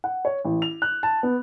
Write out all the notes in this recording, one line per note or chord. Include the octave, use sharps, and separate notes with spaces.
F#5
C#5
A1
F7
F#6
A5
B3